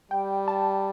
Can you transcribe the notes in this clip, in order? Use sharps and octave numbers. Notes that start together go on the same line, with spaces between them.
G3 G5
A5